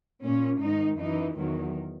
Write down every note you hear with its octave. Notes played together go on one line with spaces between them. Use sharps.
A#2 C#4
G#2 D#3 D#4
F#2 E3 D#4
E2 D#3 F#3